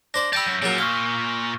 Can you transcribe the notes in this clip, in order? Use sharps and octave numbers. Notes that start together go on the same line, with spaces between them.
D4 C5 D5 A#6
D5 G5 A5 B5 E6 G6
F#2
A#2 C#3 F#3 A#4
F5 C#6 F6 G7